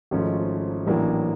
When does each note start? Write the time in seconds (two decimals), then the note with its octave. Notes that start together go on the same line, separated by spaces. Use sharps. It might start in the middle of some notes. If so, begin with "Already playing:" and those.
0.11 G#1 G#2 F3 A3 C#4
0.86 A1 A2 F#3 A#3 D4